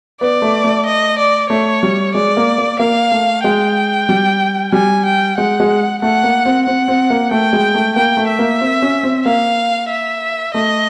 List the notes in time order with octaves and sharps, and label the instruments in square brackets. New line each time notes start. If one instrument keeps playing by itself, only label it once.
[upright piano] B3 [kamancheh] D5
[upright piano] A3
A3
[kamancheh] D#5
D5
[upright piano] A3 [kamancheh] C#5
[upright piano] G3
[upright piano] G#3 [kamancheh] D5
[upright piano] A#3
A#3
[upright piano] A#3 [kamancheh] F5
[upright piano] A3
[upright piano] G#3 [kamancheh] G5
[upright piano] G3
[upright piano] G3 [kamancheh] G#5
[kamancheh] G5
[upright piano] G#3 [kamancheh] F#5
[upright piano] G#3
[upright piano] A3 [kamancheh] F#5
[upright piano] A#3
C4
[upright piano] C4 [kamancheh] F#5
[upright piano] C4
A#3
[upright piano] A3 [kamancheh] G5
[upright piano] G#3
A3
[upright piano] A#3 [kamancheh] G5
[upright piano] A3
[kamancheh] E5
[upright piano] A#3
C4
C#4
C4
[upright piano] A#3 [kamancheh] F5
[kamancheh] E5
[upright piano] A3 [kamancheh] D#5